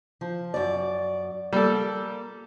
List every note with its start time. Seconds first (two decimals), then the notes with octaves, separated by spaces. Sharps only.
0.21 F3
0.54 F#2 D5
1.53 G3 A#3 A4